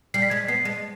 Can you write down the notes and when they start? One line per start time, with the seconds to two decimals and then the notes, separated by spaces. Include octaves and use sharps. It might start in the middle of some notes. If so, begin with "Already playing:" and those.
0.14 G3 C7
0.22 B6
0.30 G#3 G#6
0.37 B6
0.48 B3 C7
0.65 G#3